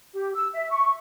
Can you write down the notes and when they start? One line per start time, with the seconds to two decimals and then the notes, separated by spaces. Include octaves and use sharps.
0.13 G4
0.34 E6
0.53 E5
0.70 C#6